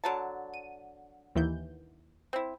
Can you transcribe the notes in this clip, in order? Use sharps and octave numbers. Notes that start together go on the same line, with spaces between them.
D3 F#3 A5
D#7
D#2 E3 G6
C4 E4